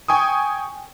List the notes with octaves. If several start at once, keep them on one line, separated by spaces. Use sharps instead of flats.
G5 G#5 C#6 D#6